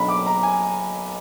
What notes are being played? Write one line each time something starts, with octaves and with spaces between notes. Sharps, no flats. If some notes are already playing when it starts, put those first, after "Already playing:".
Already playing: B1 B2 F#3 D4 B5
D6
A#5
G#5